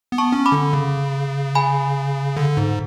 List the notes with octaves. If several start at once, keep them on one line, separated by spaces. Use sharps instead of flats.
B3
A5 C#6
C#4
B5 D6
D3
C#3
G#5 B5
D3
G#2